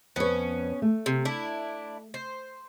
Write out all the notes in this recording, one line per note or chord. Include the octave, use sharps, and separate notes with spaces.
F2 B3 C#4 B4
A3
C3
D4 E4
C5